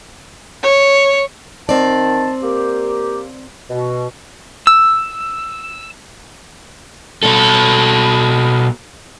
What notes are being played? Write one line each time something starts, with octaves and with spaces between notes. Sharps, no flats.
C#5
D#3 C4 D5 A5
A#3 G4
B2
E6
B2 A4